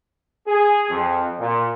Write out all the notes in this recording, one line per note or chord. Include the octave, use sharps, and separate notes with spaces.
G#4
F2
A#2